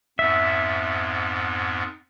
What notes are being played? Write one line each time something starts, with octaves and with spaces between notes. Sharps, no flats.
F2 G#2 B3 E5